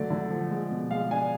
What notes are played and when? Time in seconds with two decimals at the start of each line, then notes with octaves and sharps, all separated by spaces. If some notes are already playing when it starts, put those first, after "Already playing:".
Already playing: D3 F#3 A3 D5
0.10 D3
0.30 F3
0.51 G#3
0.71 B2
0.91 G#3 F5
1.11 D4 G#5